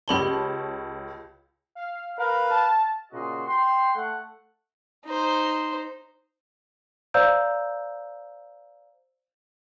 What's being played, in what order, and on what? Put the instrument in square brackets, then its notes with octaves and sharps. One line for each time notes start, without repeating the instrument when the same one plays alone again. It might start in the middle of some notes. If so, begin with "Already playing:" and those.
[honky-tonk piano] C#2 C#5 A5 [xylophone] G4 B5 G7
[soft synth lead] F5
[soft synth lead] A#4 [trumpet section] B4 F5
[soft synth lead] A5
[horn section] A#2 C#3 F#4 D#5 C6
G5 C6
A3 A4 F#5
[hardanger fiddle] D#4 C5
[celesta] C5 D5 F5 A#5 E6 G6